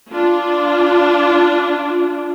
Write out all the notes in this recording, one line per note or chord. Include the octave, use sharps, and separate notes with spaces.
D4 F4